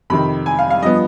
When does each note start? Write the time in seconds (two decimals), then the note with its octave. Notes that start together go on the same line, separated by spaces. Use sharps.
0.10 F2 C3 D#3 B5
0.46 G#5
0.59 F5
0.70 F5
0.82 G2 F3 B3 D#5